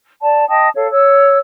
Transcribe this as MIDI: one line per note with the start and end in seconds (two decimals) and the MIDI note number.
0.22 0.48 74
0.22 0.48 81
0.49 0.69 75
0.49 0.69 79
0.49 0.69 81
0.49 0.69 87
0.76 0.87 69
0.76 0.87 73
0.76 0.87 77
0.91 1.39 73
0.91 1.39 88